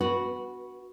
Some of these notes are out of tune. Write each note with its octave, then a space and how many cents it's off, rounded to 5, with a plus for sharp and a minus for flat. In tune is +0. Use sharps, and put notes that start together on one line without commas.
F#4 +0 B4 -15